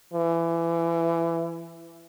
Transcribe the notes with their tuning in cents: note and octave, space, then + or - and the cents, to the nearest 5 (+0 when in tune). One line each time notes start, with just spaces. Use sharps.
E3 +25